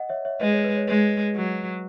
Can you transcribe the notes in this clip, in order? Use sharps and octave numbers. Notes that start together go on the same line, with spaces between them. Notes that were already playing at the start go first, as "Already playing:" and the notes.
Already playing: D#5 F#5
C#5 E5
C#5 E5
G#3 B4 D#5
C#5
B4
C#5
G#3 B4
F#3